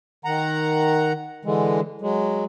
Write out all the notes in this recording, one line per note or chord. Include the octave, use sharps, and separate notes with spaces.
D#3 F#5 A#5
D3 E3 G#3
F#3 G#3